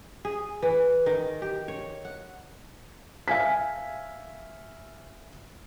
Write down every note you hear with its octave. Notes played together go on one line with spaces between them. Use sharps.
G#4
E3
D#3
G4
C#5
F#5
E5 F5 G#5 B6